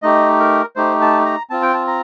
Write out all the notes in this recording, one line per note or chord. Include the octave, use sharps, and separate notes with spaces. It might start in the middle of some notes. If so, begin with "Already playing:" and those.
A3 D#4 G4 D#5
A#4
A3 D#4 G4 C5
A5
A#5
C4 F4 A5
G5
A5
A#5